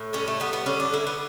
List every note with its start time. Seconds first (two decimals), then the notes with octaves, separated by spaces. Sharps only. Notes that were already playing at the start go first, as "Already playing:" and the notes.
Already playing: A2
0.13 G3 C#4
0.28 A3
0.40 G3 B3
0.53 B3
0.66 D3 C#4
0.80 D4
0.93 D3 E4
1.07 B3